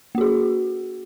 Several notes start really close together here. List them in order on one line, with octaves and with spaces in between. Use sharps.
A#3 F#4 G#4